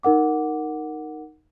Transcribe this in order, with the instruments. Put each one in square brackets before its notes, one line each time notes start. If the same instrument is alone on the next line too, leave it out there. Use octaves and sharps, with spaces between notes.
[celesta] D#4 A#4 F#5 D6